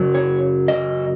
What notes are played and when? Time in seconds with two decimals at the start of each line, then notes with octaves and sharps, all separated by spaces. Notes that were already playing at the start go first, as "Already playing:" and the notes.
Already playing: F#2 C#3 F#3
0.15 C#5
0.68 D#5